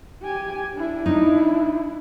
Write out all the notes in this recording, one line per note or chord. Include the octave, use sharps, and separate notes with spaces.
G4 G#5
D4 E4
D#4